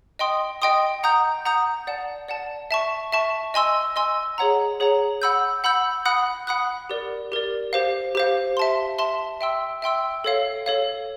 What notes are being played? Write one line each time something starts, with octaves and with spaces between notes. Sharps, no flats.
D#5 G5 C6 D#6
D#5 G5 C6 D#6
F#5 A#5 D#6 G6
F#5 A#5 D#6 G6
D5 F#5 A5
D5 F#5 A5
E5 A5 C#6
E5 A5 C#6
D#5 G#5 C6 E6
D#5 G#5 C6 E6
G#4 C#5 F#5 A#5
G#4 C#5 F#5 A#5
F#5 B5 E6 G6
F#5 B5 E6 G6
F#5 B5 D#6 F#6
F#5 B5 D#6 F#6
G4 A#4 D5
G4 A#4 D5
G4 C5 F5
G4 C5 F5
E5 A5 C6
E5 A5 C6
E5 G5 C6 E6
E5 G5 C6 E6
A4 C#5 F5
A4 C#5 F5